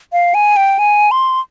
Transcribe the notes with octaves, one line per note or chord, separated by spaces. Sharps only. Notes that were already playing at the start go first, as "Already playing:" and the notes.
F5
G#5
G5
G#5
C6